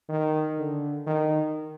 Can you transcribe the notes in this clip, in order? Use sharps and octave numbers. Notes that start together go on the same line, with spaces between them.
D#3
D3
D#3